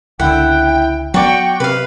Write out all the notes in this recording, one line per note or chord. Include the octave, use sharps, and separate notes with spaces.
C#2 D3 E4 F#5 G5
F#3 B3 F#4 D5 G5 C#6
C3 B4 F5